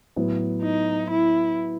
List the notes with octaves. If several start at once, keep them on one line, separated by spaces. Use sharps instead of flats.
A2 F#3 B3
D#4
E4